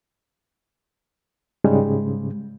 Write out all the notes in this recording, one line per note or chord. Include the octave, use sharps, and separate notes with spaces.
G#2 C#3 G3 G#3